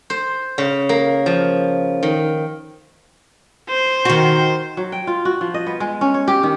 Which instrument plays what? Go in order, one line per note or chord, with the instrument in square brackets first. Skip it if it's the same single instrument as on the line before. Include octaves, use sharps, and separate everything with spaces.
[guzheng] C5
C#3
A#3
F3
D#3
[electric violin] C5
[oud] D#3 F#4
[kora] F#3
G5
F4
F#4
F3
D#5
B3
G#3
C#4
C#5
G4
D#3